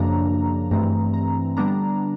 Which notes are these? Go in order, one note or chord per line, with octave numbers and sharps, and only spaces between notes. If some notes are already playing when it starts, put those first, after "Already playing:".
Already playing: F#2 C#3 F3 A#3 D4 A#5
G2 E3 A3 C4 A#5
A#5
D3 G3 B3 D4 A#5